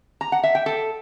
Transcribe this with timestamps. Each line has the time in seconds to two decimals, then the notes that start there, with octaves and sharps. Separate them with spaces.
0.21 A#5
0.32 F#5
0.43 E5
0.55 G5
0.66 A4